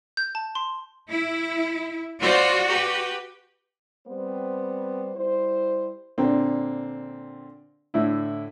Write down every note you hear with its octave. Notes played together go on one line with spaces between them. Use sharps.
G6
A5
C6
E4
F4 F#4 C5 D5
G4 B4
G3 B3 C4 C5
G3 E4 C5
A#2 D3 C4
A2 D3 E4